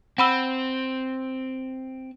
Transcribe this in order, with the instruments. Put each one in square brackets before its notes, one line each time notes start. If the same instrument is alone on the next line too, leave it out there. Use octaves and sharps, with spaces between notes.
[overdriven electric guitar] C4 [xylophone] F#5 B5 E6